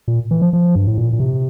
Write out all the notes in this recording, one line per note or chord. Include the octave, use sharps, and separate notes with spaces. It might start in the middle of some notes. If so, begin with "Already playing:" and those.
A#2
E3
F3
F3
G2
A2
A#2
A#2
C3